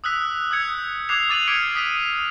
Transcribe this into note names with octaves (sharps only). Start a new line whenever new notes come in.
D#6 E6 F#6 B6
D#6 E6 G6 G#6 C#7
D6 D#6 F#6 G#6 C7 F7
D6 A6 D#7 F7 F#7
D6 F6 G#6 B6 C#7 D7
D#6 B6 D#7